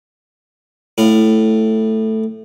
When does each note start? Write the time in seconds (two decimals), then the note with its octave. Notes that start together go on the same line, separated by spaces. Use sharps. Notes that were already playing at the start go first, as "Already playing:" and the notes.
0.98 A2 F5